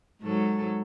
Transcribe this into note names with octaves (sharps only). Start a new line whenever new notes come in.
G#2 F#3 A4